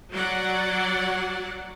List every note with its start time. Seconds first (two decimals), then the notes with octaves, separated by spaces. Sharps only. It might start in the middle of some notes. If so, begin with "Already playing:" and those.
0.12 F#3 D5 F#5